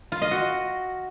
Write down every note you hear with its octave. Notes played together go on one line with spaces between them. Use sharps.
F4
D#5
F#4